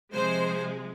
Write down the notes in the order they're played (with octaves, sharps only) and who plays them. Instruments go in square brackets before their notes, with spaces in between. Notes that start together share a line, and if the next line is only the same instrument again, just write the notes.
[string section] C3 F3 G#3 C5